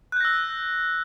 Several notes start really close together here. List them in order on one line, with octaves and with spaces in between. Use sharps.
F#6 G6 A#6 E6